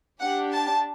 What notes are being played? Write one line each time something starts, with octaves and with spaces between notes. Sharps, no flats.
D4 G4 F#5
A5